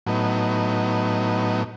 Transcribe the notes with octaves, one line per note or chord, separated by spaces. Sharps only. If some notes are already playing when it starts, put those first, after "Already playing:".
A2 F#3 B3 D#4